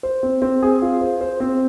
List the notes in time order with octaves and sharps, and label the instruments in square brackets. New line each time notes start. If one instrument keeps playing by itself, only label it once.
[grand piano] C5
C4
C4
G#4
F4
C5
C5
C4